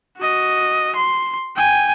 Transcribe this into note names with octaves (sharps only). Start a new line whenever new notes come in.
F#4 D#5
C6
G5 G#5